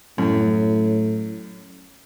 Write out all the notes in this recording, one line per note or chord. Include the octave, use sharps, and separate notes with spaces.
F#2 A2